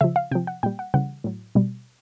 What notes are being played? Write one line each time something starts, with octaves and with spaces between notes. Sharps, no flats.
C#3 F3 E5
F5
C3 F3 G5
F#5
A#2 G3 G5
F#5
C#3 E3 G3 F#5
A2 F#3
B2 G3